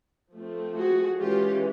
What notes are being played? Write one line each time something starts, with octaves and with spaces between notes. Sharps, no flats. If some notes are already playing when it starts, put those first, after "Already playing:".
F3 A3 C4
F#4 G#4
E3 G#3 C#4 F4 G4